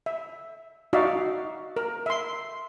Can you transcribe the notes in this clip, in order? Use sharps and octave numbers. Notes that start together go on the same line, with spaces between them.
E5
D#4 F#4 D5 E5 F5
A#4
E5 C6